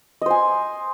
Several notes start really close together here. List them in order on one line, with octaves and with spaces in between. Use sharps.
D#5 C5 G#5